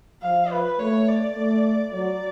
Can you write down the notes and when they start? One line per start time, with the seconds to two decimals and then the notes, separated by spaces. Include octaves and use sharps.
0.22 F3 F5
0.51 B4
0.79 A3 C#5
1.08 D5
1.36 A3
1.92 F#3 D5